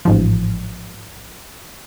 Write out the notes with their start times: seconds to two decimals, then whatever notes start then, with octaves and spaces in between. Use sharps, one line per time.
0.05 A1 G#2 F3